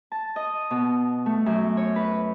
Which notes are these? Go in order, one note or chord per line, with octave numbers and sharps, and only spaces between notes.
A5
D#5
B2
A3
F#2
C#5
B4